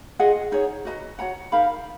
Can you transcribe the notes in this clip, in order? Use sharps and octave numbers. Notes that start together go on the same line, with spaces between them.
F4 G#4 D#5 F#5
D#4 G#4 C#5
F#4 B4 D#5 A#5
F#4 C#5 F#5 A#5
D#4 A#4 F5 B5